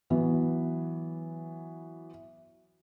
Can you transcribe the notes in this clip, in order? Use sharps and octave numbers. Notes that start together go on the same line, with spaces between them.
E3 F#3 B3